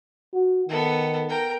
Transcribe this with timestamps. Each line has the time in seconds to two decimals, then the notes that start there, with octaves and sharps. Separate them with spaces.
0.33 F#4
0.69 D#3 B3 A4
1.29 A#4 G5